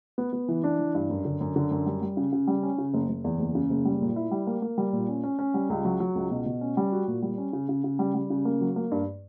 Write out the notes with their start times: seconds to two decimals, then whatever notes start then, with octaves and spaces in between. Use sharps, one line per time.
0.18 B3
0.33 B3
0.48 E3
0.64 D4
0.79 E3
0.95 G2
1.10 F#2
1.25 D3
1.41 F#2
1.56 D3
1.71 F#2
1.86 G3
2.02 G3
2.17 C#3
2.32 C#3
2.47 G3
2.63 C#4
2.78 C#3
2.94 F#1
3.09 F#1
3.24 E2
3.39 F#1
3.55 C#3
3.70 F#1
3.85 G3
4.01 A#2
4.16 E4
4.31 G3
4.47 A#3
4.62 A#3
4.78 G3
4.93 A#2
5.08 C#4
5.24 C#4
5.39 C#4
5.54 G3
5.70 C#2
5.85 F#3
6.00 F#3
6.15 C#2
6.31 B2
6.46 B2
6.61 C#4
6.77 G3
6.92 F#4
7.08 A#2
7.22 G3
7.38 C#4
7.53 C#3
7.69 C#3
7.84 C#3
7.99 G3
8.15 G3
8.30 C#3
8.45 A#3
8.61 F#3
8.76 A#3
8.91 G2